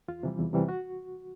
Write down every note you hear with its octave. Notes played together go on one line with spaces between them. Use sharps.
E2 F4
C3 E3 G3
E2
C3 E3 G3
F#4